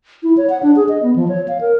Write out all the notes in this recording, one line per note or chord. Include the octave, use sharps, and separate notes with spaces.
E4
C#5
F#5
D4
G#4
D#5
B3
F3
C#5
F5
A#4